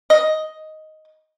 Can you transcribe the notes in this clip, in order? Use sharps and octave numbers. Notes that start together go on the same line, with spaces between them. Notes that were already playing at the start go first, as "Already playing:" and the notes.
D#5